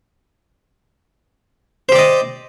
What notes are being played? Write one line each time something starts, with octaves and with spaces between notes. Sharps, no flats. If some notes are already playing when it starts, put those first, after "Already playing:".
G4 C5 D5 D#5